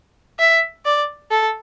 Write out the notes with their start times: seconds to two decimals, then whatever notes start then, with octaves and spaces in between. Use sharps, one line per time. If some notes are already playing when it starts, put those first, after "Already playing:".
0.39 E5
0.85 D5
1.31 A4